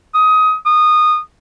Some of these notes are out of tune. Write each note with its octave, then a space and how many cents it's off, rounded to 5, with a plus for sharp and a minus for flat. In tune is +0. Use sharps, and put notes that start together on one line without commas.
D#6 +20
D#6 -20